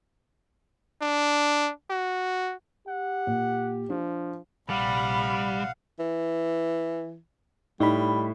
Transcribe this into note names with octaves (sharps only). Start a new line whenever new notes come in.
D4
F#4
G4 F#5
A#2
F3 D4
A#1 C3 G3 F5 F#5 B5
E3
A2 G3 D#4 B5